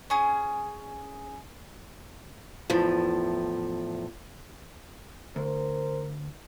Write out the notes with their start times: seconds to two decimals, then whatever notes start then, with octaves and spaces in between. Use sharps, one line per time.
0.10 C#4 G#4
2.70 E2 A2 F3
5.36 D2 A#4 C5